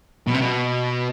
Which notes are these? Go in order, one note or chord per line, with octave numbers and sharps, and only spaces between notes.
B2
C3
B2